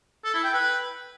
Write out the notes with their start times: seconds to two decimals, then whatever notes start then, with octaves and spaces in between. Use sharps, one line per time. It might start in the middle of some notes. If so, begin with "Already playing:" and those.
0.24 A4
0.34 E4
0.44 G5
0.54 B4